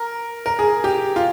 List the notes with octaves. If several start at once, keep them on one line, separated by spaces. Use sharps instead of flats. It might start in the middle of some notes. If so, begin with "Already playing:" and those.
Already playing: A#4
A#4
G#4
G4
F4